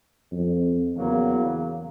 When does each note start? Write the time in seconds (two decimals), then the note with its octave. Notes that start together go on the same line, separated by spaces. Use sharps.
0.32 F2
0.96 E2 C#3 F#3 A#3